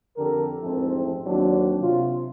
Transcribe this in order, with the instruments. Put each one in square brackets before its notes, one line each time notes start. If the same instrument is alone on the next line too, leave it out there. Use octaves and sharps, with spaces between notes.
[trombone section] F2 D3 G4 A4 A#4
A1 F2 G#2 C4 E4 A4
D#2 F#3 C4 D4
C3 F4